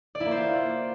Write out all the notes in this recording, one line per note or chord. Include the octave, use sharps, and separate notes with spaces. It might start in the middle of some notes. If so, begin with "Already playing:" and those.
D5
E4
A#3
C5
F4